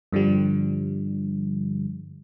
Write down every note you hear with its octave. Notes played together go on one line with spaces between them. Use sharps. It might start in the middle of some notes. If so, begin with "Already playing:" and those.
G2 D3 F3 G3